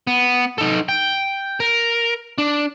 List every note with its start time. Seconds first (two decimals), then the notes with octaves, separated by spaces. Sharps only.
0.07 B3
0.58 D#4 A4
0.89 G5
1.60 A#4
2.38 D4